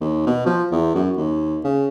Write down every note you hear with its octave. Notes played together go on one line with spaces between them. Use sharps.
D#2
B2
F3
E2
F#2
D#2
C#3